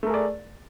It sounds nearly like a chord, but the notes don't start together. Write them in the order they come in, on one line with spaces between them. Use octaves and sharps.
A3 A#4 G#4 D5